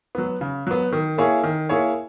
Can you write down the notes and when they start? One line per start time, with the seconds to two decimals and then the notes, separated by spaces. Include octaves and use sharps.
0.15 F#3 B3
0.41 C#3
0.67 F#3 B3
0.93 D#3
1.18 A#3 E4 G#4 C#5
1.44 D#3
1.69 A#3 E4 G#4 C#5